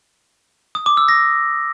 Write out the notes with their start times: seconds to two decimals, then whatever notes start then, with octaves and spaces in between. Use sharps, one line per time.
0.75 D#6
0.86 D6
0.97 E6
1.08 A#6